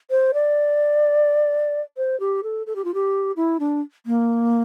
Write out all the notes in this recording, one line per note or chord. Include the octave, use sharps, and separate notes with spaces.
C5
D5
C5
G4
A4
A4
G4
F4
G4
E4
D4
A#3